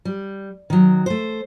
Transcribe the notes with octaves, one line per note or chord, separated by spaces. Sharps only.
G3
D#3 F#3
A3 C5